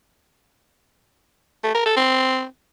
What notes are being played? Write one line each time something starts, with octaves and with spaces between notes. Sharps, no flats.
A3
A#4
A4
C4